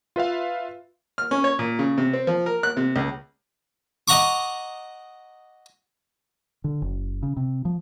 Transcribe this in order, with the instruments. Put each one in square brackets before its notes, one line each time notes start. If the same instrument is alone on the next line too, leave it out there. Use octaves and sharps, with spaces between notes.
[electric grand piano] F4 B4 E5 F5
[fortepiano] F6
C#4
C#5
A#2
C#3
C3
C4
F3
A#4
F#6
C3
C#2
[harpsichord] D#5 F#5 A#5 C#6 D6
[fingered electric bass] D3
F#1
C#3
C3
F3